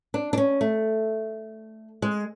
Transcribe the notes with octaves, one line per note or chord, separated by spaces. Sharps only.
D4
D4
C#4
A3
G#3